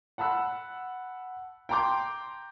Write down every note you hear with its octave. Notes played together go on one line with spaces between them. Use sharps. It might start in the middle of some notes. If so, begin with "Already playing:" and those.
F#5 A5 B5 E6 F#6
G5 A5 A#5 C6 D6 G6